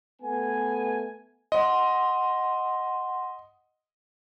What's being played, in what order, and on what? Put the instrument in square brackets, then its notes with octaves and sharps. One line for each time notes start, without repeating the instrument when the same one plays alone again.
[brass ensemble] A3 B3 G#5
[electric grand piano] D#5 [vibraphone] F#5 C6